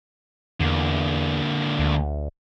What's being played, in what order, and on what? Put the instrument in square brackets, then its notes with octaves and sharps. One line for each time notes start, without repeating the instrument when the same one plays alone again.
[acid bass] E2 [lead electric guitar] D3 A#3
[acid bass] D2